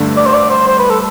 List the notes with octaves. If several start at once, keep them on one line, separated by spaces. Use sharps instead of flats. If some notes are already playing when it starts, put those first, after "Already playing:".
Already playing: G2 D3 A3
D5
C5
D5
C5
C5
B4
A4